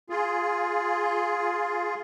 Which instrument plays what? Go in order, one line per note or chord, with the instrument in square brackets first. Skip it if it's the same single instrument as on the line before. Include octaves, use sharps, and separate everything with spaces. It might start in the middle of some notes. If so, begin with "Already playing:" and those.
[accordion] F4 G#4